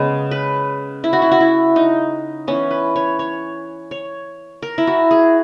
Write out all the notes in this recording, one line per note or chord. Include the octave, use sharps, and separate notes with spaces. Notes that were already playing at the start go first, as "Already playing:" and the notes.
Already playing: C#3 G#3 B3 G#4
B4
E4
F#4
E4
F#4
E4
D#4
E3 B3 C#4
B4
C#5
C#5
C#5
A#4
E4
F#4
G#4